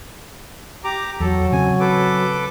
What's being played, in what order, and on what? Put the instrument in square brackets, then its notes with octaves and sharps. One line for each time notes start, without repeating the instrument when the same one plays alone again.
[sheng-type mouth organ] G4 A#5 D6
[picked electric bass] E2 [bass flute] F#3 [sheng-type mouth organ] A4
[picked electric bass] C#3 C4 [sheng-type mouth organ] G#5
[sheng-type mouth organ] A4 B4 D6